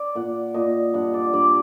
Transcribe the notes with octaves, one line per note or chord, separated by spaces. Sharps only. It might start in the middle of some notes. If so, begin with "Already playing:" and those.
Already playing: D5
A#2 F#5
A#2 D#5
G2 F#5
D5
G2 D5